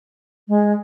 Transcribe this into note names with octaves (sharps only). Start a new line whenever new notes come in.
G#3